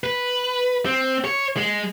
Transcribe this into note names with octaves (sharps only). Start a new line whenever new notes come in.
B4
C4
C#5
G#3